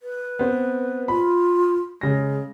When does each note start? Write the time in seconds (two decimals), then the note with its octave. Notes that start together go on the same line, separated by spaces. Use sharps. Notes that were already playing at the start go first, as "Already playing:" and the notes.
0.02 B4
0.39 B3 C4
1.08 F4 B5
2.01 C#3 G#3 A#6